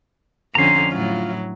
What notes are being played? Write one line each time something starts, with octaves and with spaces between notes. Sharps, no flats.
F2 D3 C#4 A#5 C6
A2 F#3 F4